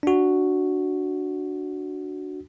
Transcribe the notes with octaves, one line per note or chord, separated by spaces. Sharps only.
D4 F#4